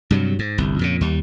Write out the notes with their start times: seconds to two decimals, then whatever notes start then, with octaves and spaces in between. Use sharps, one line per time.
0.11 G2 C3 F#3
0.39 G#2
0.58 G1 C2
0.79 F2 A#2 C#3
1.01 D#2 G3